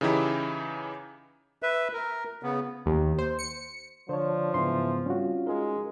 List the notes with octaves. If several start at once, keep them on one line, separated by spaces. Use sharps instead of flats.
C#3 E3 D#4 E4 G4
B4 E5
A#4
C#3 B3
D#2
C5
C#7
D3 F3 D4 C5 C#5
G#2 C#3 E3 B3 C6
G3 C4 C#4 F4 F#4
G#3 D#4 A#4